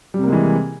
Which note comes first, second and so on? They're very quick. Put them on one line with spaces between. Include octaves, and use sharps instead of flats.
G3 C3 A#3 G#3 E3